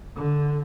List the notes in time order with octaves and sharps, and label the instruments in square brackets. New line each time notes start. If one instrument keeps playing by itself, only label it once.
[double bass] D3